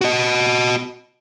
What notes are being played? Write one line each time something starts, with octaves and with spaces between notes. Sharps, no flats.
F#4 D#5